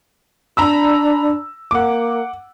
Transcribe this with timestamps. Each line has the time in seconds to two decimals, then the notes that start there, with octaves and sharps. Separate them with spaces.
0.57 D4 A#5 B5 E6
1.71 A#3 F#5 D6